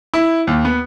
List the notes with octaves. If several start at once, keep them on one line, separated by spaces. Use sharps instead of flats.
E4
D#2
B3